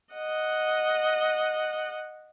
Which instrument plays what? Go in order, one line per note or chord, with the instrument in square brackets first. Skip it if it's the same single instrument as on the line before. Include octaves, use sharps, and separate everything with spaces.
[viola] D#5 F#5